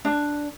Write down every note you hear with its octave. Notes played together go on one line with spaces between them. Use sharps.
D4